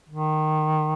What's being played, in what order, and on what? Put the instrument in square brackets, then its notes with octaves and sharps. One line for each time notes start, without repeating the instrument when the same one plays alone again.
[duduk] D#3